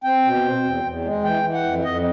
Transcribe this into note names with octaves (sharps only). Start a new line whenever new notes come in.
C4 G5
B2
C4
E2
E2
G#3
E3 G5
E3
F#5
F2
F2 D#5